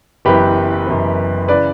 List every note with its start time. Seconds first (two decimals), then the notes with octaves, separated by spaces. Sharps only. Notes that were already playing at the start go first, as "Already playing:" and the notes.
0.25 F#1 F#2 E3 B3 G4 B4
0.87 F#1 F#2 E3 B3
1.48 C#3 E3 B4 D5